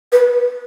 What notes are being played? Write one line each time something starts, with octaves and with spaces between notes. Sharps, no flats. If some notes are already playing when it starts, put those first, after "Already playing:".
B4